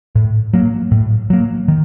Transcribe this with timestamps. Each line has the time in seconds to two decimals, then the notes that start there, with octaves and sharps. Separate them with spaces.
0.15 A2
0.53 F#3 A#3
0.91 A2
1.30 F#3 A#3
1.68 D#3